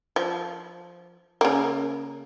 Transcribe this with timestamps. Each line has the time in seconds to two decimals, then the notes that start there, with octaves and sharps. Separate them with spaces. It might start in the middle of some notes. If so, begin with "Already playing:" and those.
0.16 F3
1.41 C#3 A#3